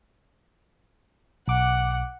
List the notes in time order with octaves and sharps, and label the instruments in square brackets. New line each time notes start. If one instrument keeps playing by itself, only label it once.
[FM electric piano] B1 D6 [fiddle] F#5